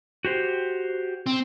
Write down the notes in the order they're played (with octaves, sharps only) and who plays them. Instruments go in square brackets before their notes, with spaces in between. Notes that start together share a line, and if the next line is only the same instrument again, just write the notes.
[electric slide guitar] F#4 G4 C5
[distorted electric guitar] C4